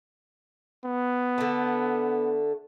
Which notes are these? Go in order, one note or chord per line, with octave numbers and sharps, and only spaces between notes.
B3
D3 A3